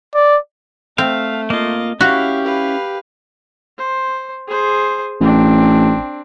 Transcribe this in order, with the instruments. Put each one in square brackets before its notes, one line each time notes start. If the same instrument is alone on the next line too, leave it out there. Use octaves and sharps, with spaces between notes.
[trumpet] D5
[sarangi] A3 [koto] C4 [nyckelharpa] E5 [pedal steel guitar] F5
[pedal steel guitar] A#3 F4 [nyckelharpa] D#5
[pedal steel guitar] C#4 E4 [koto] F#4 [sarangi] G4 [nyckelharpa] F5
[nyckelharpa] B4 F5
C5
G#4 C5
[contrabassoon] A1 [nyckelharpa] C4 D4